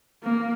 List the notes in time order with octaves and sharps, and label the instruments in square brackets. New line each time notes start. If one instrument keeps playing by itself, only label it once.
[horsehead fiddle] A#3